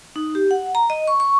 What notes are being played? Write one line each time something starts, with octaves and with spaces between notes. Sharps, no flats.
D#4
G4
F#5
A#5
D#5
C#6
C#6